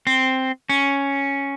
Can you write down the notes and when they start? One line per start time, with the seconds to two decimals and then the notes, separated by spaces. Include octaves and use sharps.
0.07 C4
0.69 C#4